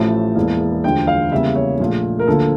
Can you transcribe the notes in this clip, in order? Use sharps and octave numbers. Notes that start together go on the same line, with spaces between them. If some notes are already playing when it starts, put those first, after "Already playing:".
Already playing: A1 A2 F3 A3 A5
E1 E2 E3 A#3
E1 D2 D3 F3 G5
F5
E2 C#3 G3 A#3 E5
C#5
A#1 A#2 A3
A#4
D2 D3 F3 A#3 A4